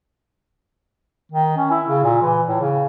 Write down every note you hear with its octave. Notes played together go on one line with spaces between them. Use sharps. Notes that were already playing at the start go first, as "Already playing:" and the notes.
D#3
C#4
E4
C#3
A#2
E3
A2
C#3